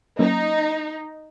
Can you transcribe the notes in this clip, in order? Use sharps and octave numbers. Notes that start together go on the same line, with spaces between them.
F#3 A#3 C#4 D#4